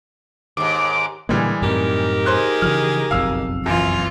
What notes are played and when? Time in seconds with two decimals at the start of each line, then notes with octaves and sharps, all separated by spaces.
0.57 D#2 G#2 D6
1.29 A#2 D3 E3 G3 G#3 A#3
1.62 F#2 A2 C3 D#4 G4 A#4
2.26 G#4 C5 C6 F#6
2.62 C#3 E3 F3 F6
3.11 F#1 B1 F2 F5 E6
3.66 F#2 E3 F4